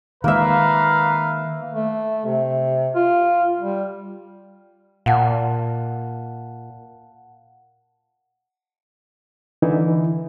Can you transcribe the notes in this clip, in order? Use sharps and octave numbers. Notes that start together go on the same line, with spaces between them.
D#3 G#3 A#3 B4 E5 F5 A#5
A3
C3
F4
G3
A#2 F5 F#5 A5
D3 E3 D#4 E4